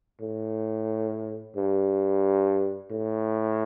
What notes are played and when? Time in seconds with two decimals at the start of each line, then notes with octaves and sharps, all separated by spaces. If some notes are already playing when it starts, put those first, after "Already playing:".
0.21 A2
1.56 G2
2.91 A2